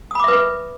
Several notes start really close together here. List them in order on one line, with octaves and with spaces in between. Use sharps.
D#6 B5 D6 E5 B4